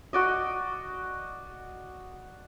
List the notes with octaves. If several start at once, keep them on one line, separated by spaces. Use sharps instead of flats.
F#4 D5 D#5